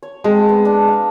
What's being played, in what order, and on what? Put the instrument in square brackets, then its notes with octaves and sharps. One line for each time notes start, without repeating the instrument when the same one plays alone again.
[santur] C#5
[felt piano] G#3 [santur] C4 A5
[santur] B3
D4
F5